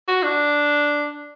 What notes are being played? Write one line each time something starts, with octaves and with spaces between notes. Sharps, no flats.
F#4
D4